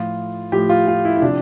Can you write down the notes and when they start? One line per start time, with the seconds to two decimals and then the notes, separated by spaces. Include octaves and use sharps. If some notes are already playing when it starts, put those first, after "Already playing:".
Already playing: A2 F3 F4
0.52 A2 F3 G4
0.69 F4
0.87 F4
1.05 E4
1.17 E4
1.22 C3 F3 D4